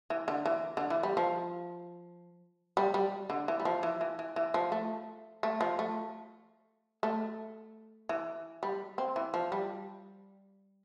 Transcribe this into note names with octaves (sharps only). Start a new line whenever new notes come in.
E3
D3
E3
D3
E3
G3
F3
G3
G3
D3
E3
G3
F3
E3
E3
E3
E3
F3
A3
A3
F3
A3
A3
E3
G3
C4
E3
F3
G3